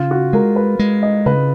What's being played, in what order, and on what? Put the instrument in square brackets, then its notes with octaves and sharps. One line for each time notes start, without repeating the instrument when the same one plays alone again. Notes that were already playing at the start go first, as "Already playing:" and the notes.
Already playing: [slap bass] C#3 [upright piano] F4
[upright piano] F#4
[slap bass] G#3 [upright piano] A#4
[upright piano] B4
[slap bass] G#3
[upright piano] D#5
[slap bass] C#3 [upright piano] B4